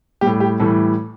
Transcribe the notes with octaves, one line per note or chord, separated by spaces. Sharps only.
A2 G3 G4
G4
A2 E3 G3 A4